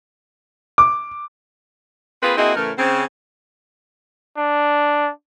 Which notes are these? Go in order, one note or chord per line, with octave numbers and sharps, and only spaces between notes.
D6
A#3 C4 F4 G#4 B4
A#3 C4 E4 F#4 G#4 D#5
A2 C#3 E3 A3 A#4
C#3 C4 C5
D4